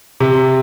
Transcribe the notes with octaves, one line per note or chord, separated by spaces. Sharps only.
C3